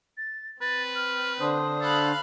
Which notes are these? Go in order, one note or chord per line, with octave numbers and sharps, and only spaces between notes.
A6
C4 B4 A6
F6
D3 D4 C5 D#6
A4 F5 B5 F#6